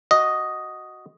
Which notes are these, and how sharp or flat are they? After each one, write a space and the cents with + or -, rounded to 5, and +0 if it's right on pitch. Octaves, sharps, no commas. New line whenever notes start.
F#4 +0 D#5 +0